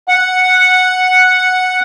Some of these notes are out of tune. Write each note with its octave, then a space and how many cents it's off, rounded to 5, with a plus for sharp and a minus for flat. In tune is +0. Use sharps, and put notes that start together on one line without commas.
F#5 -5